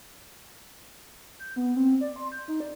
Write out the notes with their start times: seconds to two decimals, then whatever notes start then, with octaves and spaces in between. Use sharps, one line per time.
1.39 G6
1.56 B3
1.76 C4
2.01 D5
2.16 C6
2.32 G6
2.48 D#4
2.60 D5